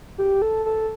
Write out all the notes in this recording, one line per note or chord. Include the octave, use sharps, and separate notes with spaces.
G4
A4
A4